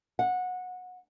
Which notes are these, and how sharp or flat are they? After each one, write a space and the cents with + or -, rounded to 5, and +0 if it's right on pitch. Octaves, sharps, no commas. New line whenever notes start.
F#5 -20